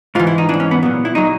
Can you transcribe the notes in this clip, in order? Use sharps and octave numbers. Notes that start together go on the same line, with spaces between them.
G#2 E3 F4
E4
D#4
G#2 E3 D4
C#4
B3
A#2 F#3 B3
E4
A#2 F#3 D#4